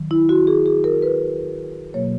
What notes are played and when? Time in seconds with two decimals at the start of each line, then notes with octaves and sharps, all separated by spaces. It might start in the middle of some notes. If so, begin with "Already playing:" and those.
Already playing: D#3 F#3
0.11 E4
0.29 F#4
0.47 G#4
0.66 G#4
0.84 A#4
1.02 B4
1.94 B2 F#3 A#3 C#5